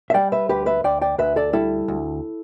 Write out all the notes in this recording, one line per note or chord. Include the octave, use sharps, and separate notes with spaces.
E5
G3 D5 G5
B4 E5
D2 G4 B4
B4 E5
D2 D5 G5
D5 G5
D2 B4 E5
A4 D5
G3 E4 A4
D2